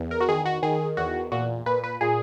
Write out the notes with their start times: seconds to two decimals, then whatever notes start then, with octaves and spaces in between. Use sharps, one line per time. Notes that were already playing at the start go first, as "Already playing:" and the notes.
Already playing: E2
0.11 A#4
0.21 F#4
0.28 D#3 G#4
0.46 F#4
0.63 D#3 G#4
0.97 E2 F#4
1.32 A#2 F#4
1.66 A#2 B4
1.84 B4
2.01 A#2 G#4